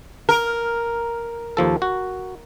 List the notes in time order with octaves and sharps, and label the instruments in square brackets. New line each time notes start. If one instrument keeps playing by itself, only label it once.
[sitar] A#4
[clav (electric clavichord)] D#2 F3 A4
F#4